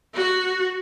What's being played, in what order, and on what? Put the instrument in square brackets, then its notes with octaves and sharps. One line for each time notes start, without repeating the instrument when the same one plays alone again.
[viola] F#4